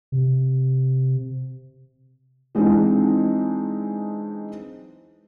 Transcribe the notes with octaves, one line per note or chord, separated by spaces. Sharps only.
C3
E3 G#3 C4 D4 D#4